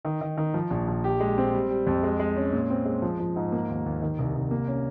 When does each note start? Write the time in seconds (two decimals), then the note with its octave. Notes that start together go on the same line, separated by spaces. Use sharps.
0.05 D#3
0.21 D#3
0.37 D#3
0.54 F3
0.70 A#1
0.88 A#1
1.04 G4
1.20 G#3
1.38 C4
1.54 G3
1.70 G3
1.87 F2
2.03 G#3
2.19 G#3
2.36 C#4
2.52 A#2
2.70 C4
2.85 G#3
3.02 F3
3.20 F3
3.36 G#2
3.52 A#3
3.69 D#2
3.86 D#2
4.02 D#3
4.19 C2
4.35 C2
4.51 A#3
4.68 C#4